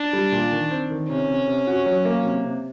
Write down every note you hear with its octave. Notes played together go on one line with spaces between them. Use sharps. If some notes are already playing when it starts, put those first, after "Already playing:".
Already playing: D4
G3
A#2
D#3
C4
D#3
C3 C#4
C3
C3
F#4
F#3
A#3
C3
C3